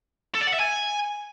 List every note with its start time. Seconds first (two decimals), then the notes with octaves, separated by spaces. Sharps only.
0.35 A4
0.41 D5
0.47 F#5
0.53 E5
0.60 G#5